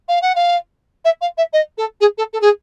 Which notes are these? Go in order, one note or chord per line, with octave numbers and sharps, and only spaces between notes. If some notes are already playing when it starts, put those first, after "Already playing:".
F5
F#5
F5
E5
F5
E5
D#5
A4
G#4
A4
A4
G#4